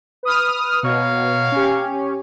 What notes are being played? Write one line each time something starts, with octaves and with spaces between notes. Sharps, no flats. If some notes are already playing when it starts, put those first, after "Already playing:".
B4 D#6 F6
B2 A#3 C#5 F5
C#4 G4